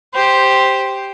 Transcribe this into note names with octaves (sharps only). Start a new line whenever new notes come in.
G4 C5